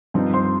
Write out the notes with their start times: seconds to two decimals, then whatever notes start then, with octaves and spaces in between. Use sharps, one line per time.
0.14 G2 F3 C4 D#4
0.34 C5 C6